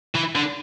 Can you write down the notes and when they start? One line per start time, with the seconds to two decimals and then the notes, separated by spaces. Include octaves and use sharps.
0.15 E3
0.35 D3